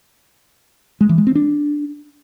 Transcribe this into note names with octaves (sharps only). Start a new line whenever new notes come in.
G#3
E3
G#3
C4
D4